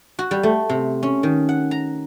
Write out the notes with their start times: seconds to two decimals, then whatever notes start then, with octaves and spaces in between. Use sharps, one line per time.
0.19 F#4
0.31 G3
0.43 A3
0.69 C3
1.03 C#4
1.23 D#3
1.49 F#5
1.71 A#5